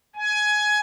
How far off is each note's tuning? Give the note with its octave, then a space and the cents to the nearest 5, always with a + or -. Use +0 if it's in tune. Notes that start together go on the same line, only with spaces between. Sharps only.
G#5 +15